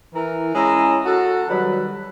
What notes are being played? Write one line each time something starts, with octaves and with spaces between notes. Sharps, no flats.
E3 A#4
G#3 C#4 E4 A#5
F#4 A4
D#3 F#3 G3 B4